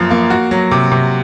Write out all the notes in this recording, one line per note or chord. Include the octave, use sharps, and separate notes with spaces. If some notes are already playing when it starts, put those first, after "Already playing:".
Already playing: F#2 F3 A#3
A#3
F#4
F#3
C3
C3